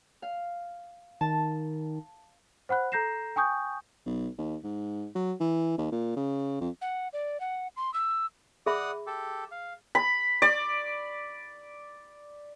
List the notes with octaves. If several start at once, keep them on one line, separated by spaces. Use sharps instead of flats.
F5
D#3 A5
C5 F#5 B5 F#6
A4 A#5 G6 A#6 C7 E7
G5 G#5 C#6 D#6 G6
B1
D#2
G#2
F#3
E3
D#2
A#2
C#3
F2
F#5
D5
F#5
C6
E6
G#4 D5 E5 F#5 B5 D#6
G4 A4
F5
B5
D5